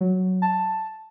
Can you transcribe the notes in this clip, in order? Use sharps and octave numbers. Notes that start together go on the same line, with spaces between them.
F#3
A5